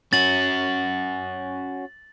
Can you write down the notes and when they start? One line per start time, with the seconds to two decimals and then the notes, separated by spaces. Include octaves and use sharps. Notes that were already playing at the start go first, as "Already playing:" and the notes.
0.13 C#4 F#4 A6 F#7